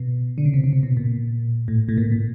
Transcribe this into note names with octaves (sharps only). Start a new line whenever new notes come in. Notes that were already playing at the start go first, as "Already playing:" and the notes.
Already playing: B2
D3
C#3
C3
C#3
C3
B2
A#2
A2
A2
A#2
A#2